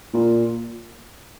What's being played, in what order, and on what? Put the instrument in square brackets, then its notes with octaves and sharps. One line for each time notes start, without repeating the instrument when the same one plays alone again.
[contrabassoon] A#2